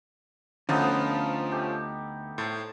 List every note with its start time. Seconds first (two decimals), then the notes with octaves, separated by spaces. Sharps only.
0.69 D2 D3 F3 B3 C#4 D#4 F4 A4
1.51 A3 G4
2.38 A2 C5 A5